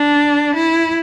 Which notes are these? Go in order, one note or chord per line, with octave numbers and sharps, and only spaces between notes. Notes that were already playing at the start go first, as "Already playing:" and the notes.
Already playing: D4
E4